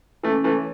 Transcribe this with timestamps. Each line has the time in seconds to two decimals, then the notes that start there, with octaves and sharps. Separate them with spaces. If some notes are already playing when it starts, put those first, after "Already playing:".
0.23 E3 A3 C#4
0.44 E3 A3
0.55 A4 C#5 E5